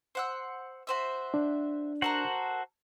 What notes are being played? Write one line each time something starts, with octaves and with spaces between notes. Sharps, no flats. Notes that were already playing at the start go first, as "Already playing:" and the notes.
C5 F#5 E6
F#4 C5 E5
D4
F#4 A4 A#4 C5 F#5 A#5